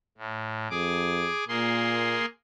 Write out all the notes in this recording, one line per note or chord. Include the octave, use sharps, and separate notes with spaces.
A2
F2 G#4 D6
A#2 A#3 G#4 C6